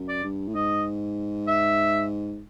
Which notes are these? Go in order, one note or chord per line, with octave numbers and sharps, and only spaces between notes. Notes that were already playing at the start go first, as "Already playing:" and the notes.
Already playing: F#2
D5
G2
A2
G#2 D#5
E5